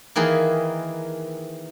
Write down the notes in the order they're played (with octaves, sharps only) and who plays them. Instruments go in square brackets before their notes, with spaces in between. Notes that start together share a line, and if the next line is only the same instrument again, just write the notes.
[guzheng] D#3 E3 A#3 G#4 B4